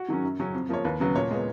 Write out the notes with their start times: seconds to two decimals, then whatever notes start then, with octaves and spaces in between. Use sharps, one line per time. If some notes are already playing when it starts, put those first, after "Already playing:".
Already playing: F#4
0.08 D#3 F#3 C#4
0.23 F#2
0.39 C#3 F#3 C#4
0.54 F2
0.69 F3 A#3 C#5
0.84 D#2 B4
1.00 C#3 F#3 B3
1.15 A#2 C#5
1.31 G#3 B3